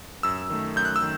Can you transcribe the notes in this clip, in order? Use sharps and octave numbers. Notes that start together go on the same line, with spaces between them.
F#2 E6
D#3 A3
F#2 G6
F#6
E6
D#3